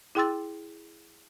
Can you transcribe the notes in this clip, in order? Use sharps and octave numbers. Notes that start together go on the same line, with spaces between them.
E4 G#4 G5 C6 E6 A6